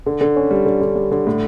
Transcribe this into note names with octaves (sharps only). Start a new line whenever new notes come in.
D3
D3
C#4
G3
D3
D3
G3
D3
A2